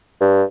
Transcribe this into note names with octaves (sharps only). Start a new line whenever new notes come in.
G2